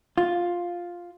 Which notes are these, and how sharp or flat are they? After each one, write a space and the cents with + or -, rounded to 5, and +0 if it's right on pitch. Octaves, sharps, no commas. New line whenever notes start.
F4 +5